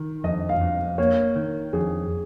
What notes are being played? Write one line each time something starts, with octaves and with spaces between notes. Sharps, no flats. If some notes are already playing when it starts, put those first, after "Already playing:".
Already playing: D#3
F2 D#5
F5
F2
A#3 C#5
D#3
F2 G#4